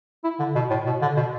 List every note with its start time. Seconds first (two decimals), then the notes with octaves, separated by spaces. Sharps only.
0.24 E4
0.39 D3
0.55 B2
0.70 A2
0.86 B2
1.02 D3
1.17 B2